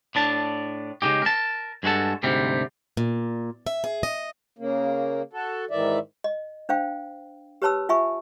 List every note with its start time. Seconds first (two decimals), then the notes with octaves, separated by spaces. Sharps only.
0.15 A2 D4 A5
1.02 C#3 G#3 D#4 G4
1.22 A#4 A5
1.83 G2 G#3 F#4 A4 A5
2.23 D2 G#2 C3 G3
2.97 A#2
3.67 E5
3.84 G#4
4.03 D#5
4.59 C#3 A#3
5.33 F#4 A4
5.71 G#2 D#3 E3 D5 E5
6.24 D#5
6.69 D4 C5 F5 G5
7.62 G4 B4 C#5 A5 B5 E6
7.89 F4 E5 G#5 B5 C#6